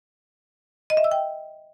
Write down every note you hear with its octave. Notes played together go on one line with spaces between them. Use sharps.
D#5
E5
E6
G5